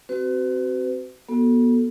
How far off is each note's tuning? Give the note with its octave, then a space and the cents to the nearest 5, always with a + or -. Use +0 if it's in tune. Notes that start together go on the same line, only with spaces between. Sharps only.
C4 +0 F#4 +30 B4 +45
B3 -35 F#4 +0 A4 +0